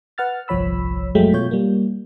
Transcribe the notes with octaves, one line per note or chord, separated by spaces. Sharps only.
B4 F#5 F6 A6
G1 C2 F3 C#5 B5 E6
F#2 F#3 G#3 A3 G5 B6
B2 F4 C#5 G6
G3 A#3